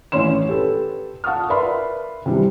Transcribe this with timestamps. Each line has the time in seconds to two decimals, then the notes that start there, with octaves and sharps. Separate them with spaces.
0.12 A1 E3 C#4 C#5 C6 E7
0.49 G4 A4 B4
1.24 F5 F#5 A5 C#6 D#6 F6
1.49 A#4 B4 D5 E5 B5 C6
2.26 C3 E3 G3